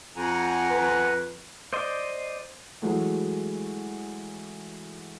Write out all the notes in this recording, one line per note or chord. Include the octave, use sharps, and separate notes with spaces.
F2 F#5 G#5 A#5
B4
C5 D5 D#5 C6
E3 F#3 G#3 A3 F#4